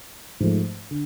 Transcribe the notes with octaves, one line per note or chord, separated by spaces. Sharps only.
G#2 F3 A3
D3